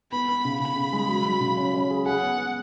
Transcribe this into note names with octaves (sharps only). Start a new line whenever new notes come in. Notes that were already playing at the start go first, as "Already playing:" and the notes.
B3 B5
B3
C#3
C#3 B5
C#3
G#3
F#3
F#3
C#3
C#4
C#4
G#4
G#4 F#5
B3
B3